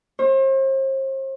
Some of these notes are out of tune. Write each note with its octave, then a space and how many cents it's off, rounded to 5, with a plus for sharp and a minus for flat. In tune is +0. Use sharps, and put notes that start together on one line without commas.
C5 +40